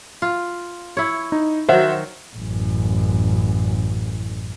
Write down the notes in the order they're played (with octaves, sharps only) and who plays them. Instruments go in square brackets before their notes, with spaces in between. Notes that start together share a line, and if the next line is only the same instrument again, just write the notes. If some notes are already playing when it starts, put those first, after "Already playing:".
[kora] F4
E4 C#5
[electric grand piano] D#4
[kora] D#3 F#3 [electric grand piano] C5 E5 F#5
[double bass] A1 F#2